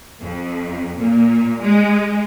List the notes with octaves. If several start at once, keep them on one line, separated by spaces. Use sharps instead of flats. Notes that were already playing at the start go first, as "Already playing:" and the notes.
F2
A#2
G#3